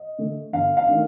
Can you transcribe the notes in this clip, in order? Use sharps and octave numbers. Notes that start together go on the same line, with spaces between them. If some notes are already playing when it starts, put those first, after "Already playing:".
Already playing: D#5
D3 A3
G1 F5
F5
D#3 A3 D4